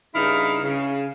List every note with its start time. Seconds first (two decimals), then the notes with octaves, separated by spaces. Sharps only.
0.15 G2 C#3 D#4 E4 F5
0.63 C#3